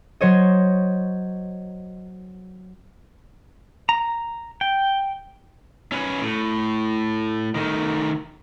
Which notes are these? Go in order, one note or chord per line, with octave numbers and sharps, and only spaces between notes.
F#3 C5 C#5 D#5
A#5
G5
C#4 B4
A2
D#3 A3